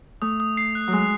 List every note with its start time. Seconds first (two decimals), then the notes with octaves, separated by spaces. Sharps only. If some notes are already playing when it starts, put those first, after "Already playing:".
0.22 A3 D#6
0.40 D#6
0.57 C7
0.75 F#6
0.87 F#3
0.93 G#3 D#6